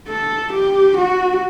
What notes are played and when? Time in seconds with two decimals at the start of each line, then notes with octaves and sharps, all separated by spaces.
0.08 A4
0.54 G4
0.98 F#4